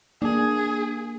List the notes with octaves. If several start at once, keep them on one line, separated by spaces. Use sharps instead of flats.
A#3 D4 G#4